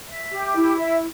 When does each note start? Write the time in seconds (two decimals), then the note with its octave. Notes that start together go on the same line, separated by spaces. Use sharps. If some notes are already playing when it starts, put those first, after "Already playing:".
0.09 E5
0.32 G4
0.55 E4
0.78 E5